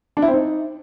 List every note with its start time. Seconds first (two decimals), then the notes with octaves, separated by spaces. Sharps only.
0.17 D4
0.22 E4
0.28 C4
0.34 D#4